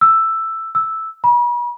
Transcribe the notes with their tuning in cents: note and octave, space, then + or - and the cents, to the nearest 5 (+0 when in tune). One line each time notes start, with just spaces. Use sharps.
E6 +5
E6 -5
B5 -40